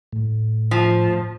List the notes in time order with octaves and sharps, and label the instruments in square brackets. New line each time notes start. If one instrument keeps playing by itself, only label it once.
[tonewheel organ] A2
[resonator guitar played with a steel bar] F3